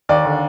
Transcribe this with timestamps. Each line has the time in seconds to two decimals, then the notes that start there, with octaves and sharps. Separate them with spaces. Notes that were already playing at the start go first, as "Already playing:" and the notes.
0.09 D#2 D5
0.25 D3